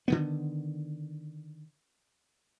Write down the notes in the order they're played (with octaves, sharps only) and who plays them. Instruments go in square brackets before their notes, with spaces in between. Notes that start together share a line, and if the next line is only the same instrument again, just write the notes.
[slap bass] D3 D#3 B3